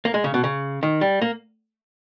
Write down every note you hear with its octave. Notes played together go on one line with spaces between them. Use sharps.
A#3
G#3
C#3
B2
C#3
D#3
G3
A#3